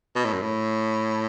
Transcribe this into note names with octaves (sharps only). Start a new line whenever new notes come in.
B2
A2
F#2
A2